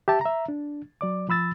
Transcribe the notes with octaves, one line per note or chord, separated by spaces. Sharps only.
G4 E5 A5
E5 A#5
D4
F#3 D5 D6
F3 B5 E6 A6